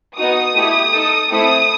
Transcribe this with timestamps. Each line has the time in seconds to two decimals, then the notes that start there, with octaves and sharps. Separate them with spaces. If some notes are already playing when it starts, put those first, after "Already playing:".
0.18 B3 D#4 F#4 D#6
0.55 A3 E4 G4
0.93 D#4 A4
1.31 A3 C4 E4 D#6